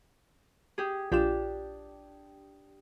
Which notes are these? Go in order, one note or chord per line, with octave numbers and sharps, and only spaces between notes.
G4 G#4
A#1 D4 F4 G4 E7